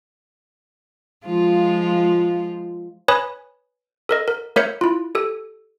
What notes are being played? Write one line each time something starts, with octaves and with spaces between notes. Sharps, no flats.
F3 G#3 F4
B4 C#5 G#5 B5 D#6
A4 A#4 D#5
A#4
A3 A#4 C#5 E5 G6 C#7
E4 F4
G4 A4